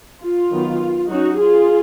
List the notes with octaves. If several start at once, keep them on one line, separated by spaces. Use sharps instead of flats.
F4
D#3 F#3 B3
F#3 C#4 D#4 F#4
F4 G#4